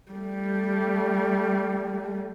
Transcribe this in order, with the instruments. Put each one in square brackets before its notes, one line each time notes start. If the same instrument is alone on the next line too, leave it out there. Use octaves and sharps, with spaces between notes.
[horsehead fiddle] G3 A3